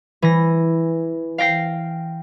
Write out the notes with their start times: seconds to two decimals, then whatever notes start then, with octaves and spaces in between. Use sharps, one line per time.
0.22 E3 A#6
1.38 F5 G5 A#6 C7